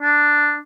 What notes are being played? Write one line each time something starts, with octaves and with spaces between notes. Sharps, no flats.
D4